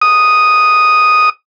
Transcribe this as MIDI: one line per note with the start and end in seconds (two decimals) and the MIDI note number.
0.02 1.30 87